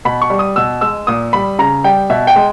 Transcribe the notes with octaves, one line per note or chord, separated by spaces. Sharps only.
B2 B5
C#6
G3
D#6
B2 E6
G#3 E6
A#2 D#6
G3 B5
C#3 A#5
G3 G5
B2 E5
G5
G#3